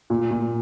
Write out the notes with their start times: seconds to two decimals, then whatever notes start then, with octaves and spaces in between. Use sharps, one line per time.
0.10 A#2
0.31 A#2